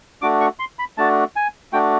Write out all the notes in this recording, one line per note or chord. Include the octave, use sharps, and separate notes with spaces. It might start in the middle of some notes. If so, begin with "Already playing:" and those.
A3 D4 F#4 D6
C#6
C6
B5
A3 D4 F#4 A5
G#5
A3 D4 F#4 G5